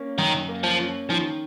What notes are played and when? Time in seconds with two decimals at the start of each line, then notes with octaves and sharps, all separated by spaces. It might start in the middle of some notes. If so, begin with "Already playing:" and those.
Already playing: A#3 C#4
0.18 F#2 D#3
0.49 A#3
0.64 F3
0.79 C#4
1.10 D#3 F3